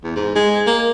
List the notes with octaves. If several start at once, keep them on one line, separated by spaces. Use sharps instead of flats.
E2
G#2
G#3
A#3